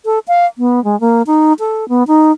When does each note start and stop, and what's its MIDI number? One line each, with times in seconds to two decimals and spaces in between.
0.05 0.19 69
0.28 0.46 77
0.58 0.82 59
0.84 0.98 56
1.00 1.22 58
1.27 1.53 63
1.59 1.88 69
1.89 2.03 59
2.07 2.32 63